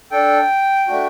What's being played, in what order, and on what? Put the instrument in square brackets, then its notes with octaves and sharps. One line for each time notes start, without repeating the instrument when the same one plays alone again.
[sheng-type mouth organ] D4 A4 G5
A3 D4 F#4